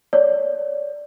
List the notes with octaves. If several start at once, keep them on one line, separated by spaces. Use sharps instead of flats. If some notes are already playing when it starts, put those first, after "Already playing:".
C#5 D5